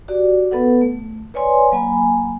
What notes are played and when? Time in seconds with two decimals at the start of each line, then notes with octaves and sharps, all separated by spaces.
0.08 F#4 G4 D5
0.51 B3 A4 B4 F#5
0.82 A3
1.34 B4 C#5 D5 G#5 C6
1.72 F#3 A#3 G#5 B5